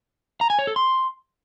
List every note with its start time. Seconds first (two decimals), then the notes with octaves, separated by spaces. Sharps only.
0.41 A#5
0.50 G#5
0.59 C#5
0.67 A4
0.76 C6